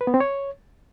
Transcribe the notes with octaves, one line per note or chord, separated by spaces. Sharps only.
B4
B3
C4
C#5